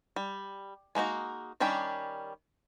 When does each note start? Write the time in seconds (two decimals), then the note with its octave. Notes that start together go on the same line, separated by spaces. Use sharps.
0.16 G3
0.95 G#3 A#3 D#4 F#4
1.60 D#3 G3 C#4 D4 G4